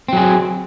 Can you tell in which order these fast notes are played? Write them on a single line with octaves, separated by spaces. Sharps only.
C4 F#3 G#4